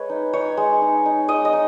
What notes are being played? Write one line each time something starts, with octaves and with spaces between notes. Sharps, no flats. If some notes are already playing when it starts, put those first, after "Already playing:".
Already playing: G#3 B4 C#5
D#4
D#4 C#5
G#3
D#4
D#4
G#3 D#5
D#5
D#4